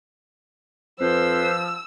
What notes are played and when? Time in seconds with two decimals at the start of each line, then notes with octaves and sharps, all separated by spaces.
1.00 F2 F3 B4 C5 E6